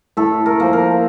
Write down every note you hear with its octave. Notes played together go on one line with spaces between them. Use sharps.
A2 A4
A#4
F3 A#3
A#4